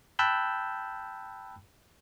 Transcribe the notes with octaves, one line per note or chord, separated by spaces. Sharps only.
G5 A5 B5 E6 F#6 G6